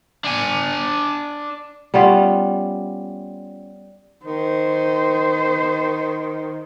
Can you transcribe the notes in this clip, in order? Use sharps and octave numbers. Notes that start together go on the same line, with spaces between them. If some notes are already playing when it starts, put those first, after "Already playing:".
D4 G#5
G3 B3 C#4 F4
D#3 C5